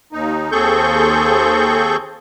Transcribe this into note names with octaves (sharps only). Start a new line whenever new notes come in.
D#2 D#4
D#2 C4 G#4 A4 C#6 G6